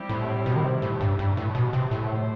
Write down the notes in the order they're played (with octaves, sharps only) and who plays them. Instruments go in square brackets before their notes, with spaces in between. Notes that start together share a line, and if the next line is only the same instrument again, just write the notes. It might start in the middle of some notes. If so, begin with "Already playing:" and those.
Already playing: [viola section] G3 C4 E4 G4
[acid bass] A2
B2
D#3
C3
A2
G2
G2
A2
B2
C3
[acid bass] A2 [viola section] F#3 A3 E4 G4 C5